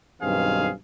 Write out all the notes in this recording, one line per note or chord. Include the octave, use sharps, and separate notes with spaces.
B1 G2 D#3 C4 G#4 F5